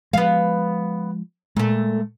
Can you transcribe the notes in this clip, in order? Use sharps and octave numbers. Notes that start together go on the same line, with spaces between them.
F3 G#3 B3 F5
A#2 G#3 A3